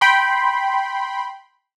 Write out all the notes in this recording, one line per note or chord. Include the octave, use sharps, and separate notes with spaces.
G5 B5 C6